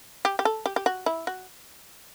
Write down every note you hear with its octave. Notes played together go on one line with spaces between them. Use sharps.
G4
G4
A4
G4
G4
F#4
E4
F#4